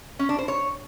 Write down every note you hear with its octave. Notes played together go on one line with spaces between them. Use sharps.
C#4
D4
C5
C#5